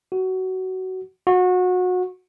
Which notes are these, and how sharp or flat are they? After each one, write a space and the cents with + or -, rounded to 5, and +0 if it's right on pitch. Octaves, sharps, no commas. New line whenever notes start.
F#4 +20
F#4 -25